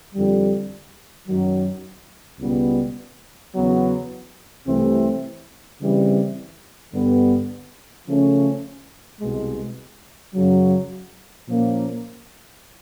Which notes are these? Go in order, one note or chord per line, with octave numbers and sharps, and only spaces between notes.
F2 D3 G3
F#2 D#3 F#3
C#2 B2 G3 B3
E2 C#3 F#3 B3
C2 C3 E3 A3 C4
C#3 E3 G3 C4
G2 D3 G3 B3
C#3 F3 A3 C#4
C2 B2 G#3
F#2 C#3 F#3
A#2 F3 A#3 C#4